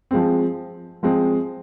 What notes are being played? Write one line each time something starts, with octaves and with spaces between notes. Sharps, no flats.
F3 G#3 C4
F3 G#3 C4